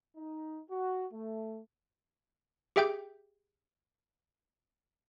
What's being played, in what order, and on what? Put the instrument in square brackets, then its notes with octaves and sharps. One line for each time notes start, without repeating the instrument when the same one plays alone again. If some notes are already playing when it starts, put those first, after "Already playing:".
[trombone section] D#4
F#4
A3
[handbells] G4 G#4 E5 G5 D6 G6